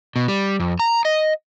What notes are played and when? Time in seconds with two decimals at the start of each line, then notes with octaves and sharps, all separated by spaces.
0.16 B2
0.28 G3
0.60 F2
0.79 A#5
1.05 D#5